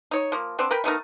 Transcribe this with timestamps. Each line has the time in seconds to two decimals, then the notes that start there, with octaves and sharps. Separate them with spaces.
0.11 D#4 C#5
0.32 F3 A#3
0.59 B3 C4 D4
0.71 A#4 B4 G5 B5
0.84 A3 B3 D#4 A#4